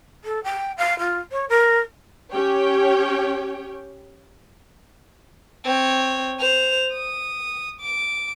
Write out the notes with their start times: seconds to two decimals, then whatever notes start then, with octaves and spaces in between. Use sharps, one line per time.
0.24 A4
0.44 G5
0.77 F5
0.99 F4
1.32 C#5
1.49 A#4
2.32 C#4 G4 C#5 G5
5.65 C4 C#5
6.40 C5 F7
6.93 D#6
7.81 D6